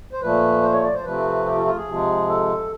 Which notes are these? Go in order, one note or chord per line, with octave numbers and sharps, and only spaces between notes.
C5
A#2 F3 A3 B4
C5
C#5
D5
C5
C3 F3 A3 C4 B4
G4
F4
F4
G#4
C3 F3 G#3
A4